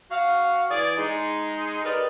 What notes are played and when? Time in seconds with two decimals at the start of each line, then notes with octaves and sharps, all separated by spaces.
0.10 F#4 F5
0.69 E3 G#4 D5
0.97 G#3 D#4
1.84 G4 A#4 B4 D5 D#5